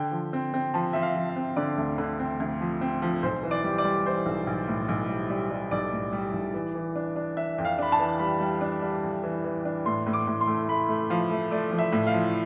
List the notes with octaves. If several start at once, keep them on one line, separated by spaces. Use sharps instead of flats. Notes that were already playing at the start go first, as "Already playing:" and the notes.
Already playing: D3 G5
F3
C4
C4
F3 A5
F3 E5
F5
F3
E5
C4
D3 D5
D2
D3
C4
D2
F3
C4
F3
B1 C5
E3
D5
G3
D5
G3
E3 C5
B1
B1
A2
B1
G3
G3
G3
B1 D5
A2
G3
B1
E3
E3
D4
D4
D4 E5
F2
F5
D4 B5
A5
E3
G3 B5
G3
D4
G3
F2
E3
E3
D4
A2 C6
A2
D6
A2
C6
A3
A3 B5
A3
F3 F5
A3
A3 D5
F3
E5
A2
F5
F3